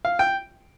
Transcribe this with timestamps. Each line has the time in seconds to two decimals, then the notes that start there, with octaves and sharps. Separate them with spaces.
0.05 F5
0.19 G5